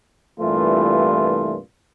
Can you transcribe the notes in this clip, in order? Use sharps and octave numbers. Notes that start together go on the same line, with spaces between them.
C2 G2 A#2 E3 A3 F4